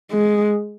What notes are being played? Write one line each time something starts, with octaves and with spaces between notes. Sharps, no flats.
G#3